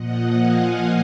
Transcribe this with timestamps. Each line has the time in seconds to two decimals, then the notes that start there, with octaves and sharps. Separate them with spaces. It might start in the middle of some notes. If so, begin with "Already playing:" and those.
Already playing: A#2 F3 D#5 F#5
0.35 F5 G#5